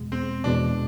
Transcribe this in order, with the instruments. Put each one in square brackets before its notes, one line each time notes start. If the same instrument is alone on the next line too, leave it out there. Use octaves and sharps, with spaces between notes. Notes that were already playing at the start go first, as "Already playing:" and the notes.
Already playing: [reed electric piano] E2 B2 G#3
[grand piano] C4
[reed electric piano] E2 B2 G#3 [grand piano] D4